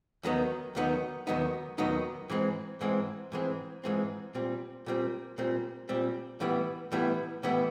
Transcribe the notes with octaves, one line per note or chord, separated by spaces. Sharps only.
D#2 D#3 F#3 B3 D#4
D#2 D#3 F#3 B3 D#4
D#2 D#3 F#3 B3 D#4
D#2 D#3 F#3 B3 D#4
G#2 E3 G#3 C4
G#2 E3 G#3 C4
G#2 E3 G#3 C4
G#2 E3 G#3 C4
A#2 G3 C4
A#2 G3 C4
A#2 G3 C4
A#2 G3 C4
A2 E3 G3 B3 E4
A2 E3 G3 B3 E4
A2 E3 G3 B3 E4